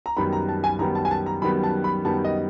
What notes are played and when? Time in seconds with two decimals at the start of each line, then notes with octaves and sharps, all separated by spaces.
0.06 A#5
0.16 F#2 D#3 G3 B3 B5
0.33 A#5
0.49 A5
0.64 G#5
0.79 F#2 D#3 G3 B3 A#5
0.95 A5
1.05 G#5
1.11 A5
1.26 A#5
1.42 F#2 D#3 G3 B3 B5
1.63 A5
1.84 B5
2.05 F#2 D#3 G3 B3 A5
2.25 D#5